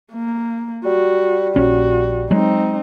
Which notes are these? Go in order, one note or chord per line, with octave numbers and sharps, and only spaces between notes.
A#3
G3 F#4
A#1 C#4 F#4
F#3 G#3 C4 D#4